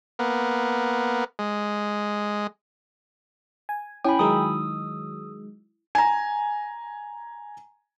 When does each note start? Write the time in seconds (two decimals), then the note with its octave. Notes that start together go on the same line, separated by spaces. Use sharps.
0.19 A#3 B3
1.39 G#3
3.69 G#5
4.05 C#4 E4 G5 G#5 B5
4.19 D#3 F#3 G#3 A#5 D#6 E6
5.95 G#5 A#5